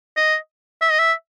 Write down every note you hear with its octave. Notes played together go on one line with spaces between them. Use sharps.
D#5
E5
D#5
E5